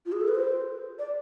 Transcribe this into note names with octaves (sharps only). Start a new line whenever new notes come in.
F4
G#4
A4
B4
C5
D5